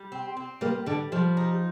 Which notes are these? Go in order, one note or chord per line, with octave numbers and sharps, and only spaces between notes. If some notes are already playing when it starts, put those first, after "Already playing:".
Already playing: G3
C4
C4
G3 A#3
D3 G3
F3 G3
D#4